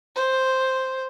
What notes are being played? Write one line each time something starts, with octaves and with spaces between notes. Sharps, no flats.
C5